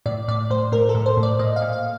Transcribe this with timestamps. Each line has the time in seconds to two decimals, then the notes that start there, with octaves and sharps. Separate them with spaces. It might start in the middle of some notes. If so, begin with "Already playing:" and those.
0.06 A2 D5
0.28 A2 D5
0.50 A2 C5
0.72 A2 A#4
0.89 A4
0.95 A2
1.06 C5
1.17 A2
1.23 D5
1.39 A#2 D#5
1.56 F5
1.62 A#2
1.73 F5